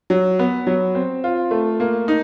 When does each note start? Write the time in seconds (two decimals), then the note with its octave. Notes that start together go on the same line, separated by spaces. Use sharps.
0.10 F#3
0.39 B3
0.67 F#3
0.95 C4
1.24 F4
1.51 A3
1.80 A#3
2.08 D#4